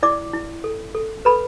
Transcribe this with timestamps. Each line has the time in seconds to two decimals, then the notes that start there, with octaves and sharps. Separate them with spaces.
0.03 E4 D5 D6
0.33 E4
0.64 A4
0.95 A4
1.25 A4 B4 B5